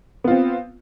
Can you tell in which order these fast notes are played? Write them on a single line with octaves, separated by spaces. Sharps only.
B3 F4 C4